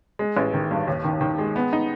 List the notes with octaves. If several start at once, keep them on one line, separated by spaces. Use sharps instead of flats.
G#3
A1
D#3
G2
D#2
D#3
D#3
G#3
B3
D#4